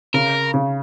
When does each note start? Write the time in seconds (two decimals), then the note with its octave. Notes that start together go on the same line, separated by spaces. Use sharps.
0.14 C#3 A#4
0.54 C#3